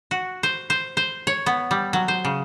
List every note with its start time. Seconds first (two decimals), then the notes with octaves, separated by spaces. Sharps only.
0.11 F#4
0.43 C5
0.70 C5
0.97 C5
1.27 C#5
1.46 B3
1.71 G3
1.93 F#3
2.08 C5
2.25 C#3